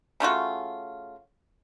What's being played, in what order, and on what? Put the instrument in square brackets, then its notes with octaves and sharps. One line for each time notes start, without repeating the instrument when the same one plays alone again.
[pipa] C#3 A3 F4 F#4